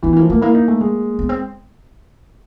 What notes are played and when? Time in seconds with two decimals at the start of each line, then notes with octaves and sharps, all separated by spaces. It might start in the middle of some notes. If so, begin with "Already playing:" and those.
0.03 E3 B3
0.13 E3
0.16 A#3
0.22 F3
0.30 A3 A#3
0.41 A#3 E4
0.55 D#4
0.68 A3
0.81 G#3
1.19 B3
1.29 C4